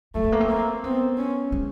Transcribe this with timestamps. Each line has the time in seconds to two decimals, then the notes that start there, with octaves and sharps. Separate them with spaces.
0.15 F#3 A3
0.24 G#3
0.32 A#3
0.40 C4
0.49 A#3
0.84 B3 C4
1.18 C#4
1.52 G#3